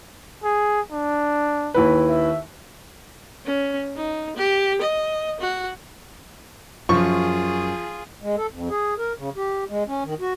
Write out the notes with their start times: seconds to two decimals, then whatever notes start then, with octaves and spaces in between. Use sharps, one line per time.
0.44 G#4
0.92 D4
1.74 D#2 E4 B4
2.09 E5
3.46 C#4
3.96 D#4
4.36 G4
4.81 D#5
5.40 F#4
6.89 F#2 F3 F4 G#4 C#6
8.22 G#3
8.38 A4
8.52 F2
8.70 G#4
8.98 A#4
9.18 C#3
9.36 G4
9.69 G#3
9.88 C#4
10.04 D#3
10.20 F#4